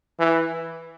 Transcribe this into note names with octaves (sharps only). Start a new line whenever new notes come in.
E3